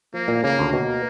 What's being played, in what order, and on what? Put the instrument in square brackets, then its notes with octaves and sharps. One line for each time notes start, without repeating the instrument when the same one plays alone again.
[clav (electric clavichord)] F3 [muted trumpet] A#3
[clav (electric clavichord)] A#2
[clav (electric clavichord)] C#3 [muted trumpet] A#3
[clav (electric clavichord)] D2
[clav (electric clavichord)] B2 [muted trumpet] A#3